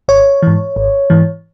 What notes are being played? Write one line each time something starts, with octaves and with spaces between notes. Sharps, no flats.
G#1 C#5
G#2 E3
G#1
G#2 E3